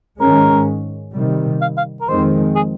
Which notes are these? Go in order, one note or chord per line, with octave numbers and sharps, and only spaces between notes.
G#2 D#3 G#3 C#4 A#4
C3 D#3 G3
F5
F5
A#4
F2 D#3 G#3 C4 C5
G#4